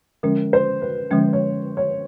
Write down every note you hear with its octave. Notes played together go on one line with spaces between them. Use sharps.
D3 F3 G#3 C#4 A#4
C5
B4
D3 F3 G#3 C#4
C#5
C#5